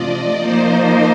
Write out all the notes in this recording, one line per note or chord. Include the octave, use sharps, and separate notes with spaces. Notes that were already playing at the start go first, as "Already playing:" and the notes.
Already playing: C3 F3 A3 D4 F4 D5 D#5
F3 A#3 D#4 C5